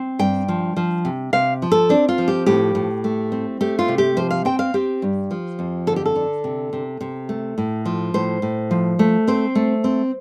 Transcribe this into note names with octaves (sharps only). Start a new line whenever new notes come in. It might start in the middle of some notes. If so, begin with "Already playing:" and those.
Already playing: C4
G2 G5
F3
F3
C3
C3 F5
F3
A4
C4 D4
F4
F3
G4
A2 G4
A2
A3
C4
A3 G4
F4
C3
G4
F3 C5
F5
C4 G5
F5
C4 G4
G2
F3
F2
D3 A4
G4
A4
D3
C3
C3
C3
A3
A2
F3
A2 C5
A2
F3
A3
C4 C5
A3
C4